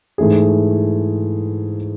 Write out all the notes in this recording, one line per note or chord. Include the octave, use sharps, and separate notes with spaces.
G#2 E3 A3 E4 G#4